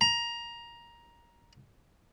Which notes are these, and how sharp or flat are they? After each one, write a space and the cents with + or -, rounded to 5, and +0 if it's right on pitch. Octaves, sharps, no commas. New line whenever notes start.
A#5 +15